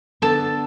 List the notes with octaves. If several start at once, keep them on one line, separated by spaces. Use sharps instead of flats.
D3 B3 D4 A4 A5